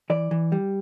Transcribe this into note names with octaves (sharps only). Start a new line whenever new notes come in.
E3 D5
E3
G3